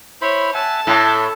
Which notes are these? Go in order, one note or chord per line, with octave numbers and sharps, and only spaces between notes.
E4 C5 C#5 B5
E5 F#5 G#5 A5
A2 A4 E5